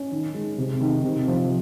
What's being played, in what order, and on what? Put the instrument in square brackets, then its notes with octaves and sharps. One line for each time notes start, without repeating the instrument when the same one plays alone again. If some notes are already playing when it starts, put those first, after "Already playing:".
Already playing: [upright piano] C#4
D#3
G#3
C3
D#3
C3
F3